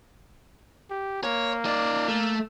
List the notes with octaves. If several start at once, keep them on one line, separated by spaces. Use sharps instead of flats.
G4
A#3 C#5
D#4 D5
A3